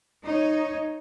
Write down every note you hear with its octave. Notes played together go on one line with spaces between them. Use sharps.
D#4 C#5